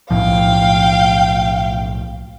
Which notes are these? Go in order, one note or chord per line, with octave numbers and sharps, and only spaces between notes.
B1 A2 F3 F5 G5